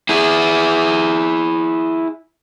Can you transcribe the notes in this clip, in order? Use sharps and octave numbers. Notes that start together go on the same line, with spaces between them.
E4 G#4